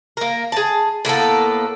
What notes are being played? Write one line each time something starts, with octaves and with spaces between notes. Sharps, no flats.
A#3 A#4
G#4 A5
A2 A#3 B3 A4